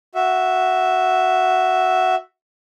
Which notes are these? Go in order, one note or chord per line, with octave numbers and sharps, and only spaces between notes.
F#4 E5